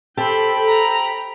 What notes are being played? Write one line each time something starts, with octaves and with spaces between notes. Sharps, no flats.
G4 A4 C5 G5 B5
A#5